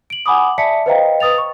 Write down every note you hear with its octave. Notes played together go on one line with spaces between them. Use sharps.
D7 F#7
F#5 G#5 B5 D6 D#6
D5 E5 A5 B6 C#7
B4 C5 D#5 F5 G5 A#5
B4 D#6 A6 F7
C#6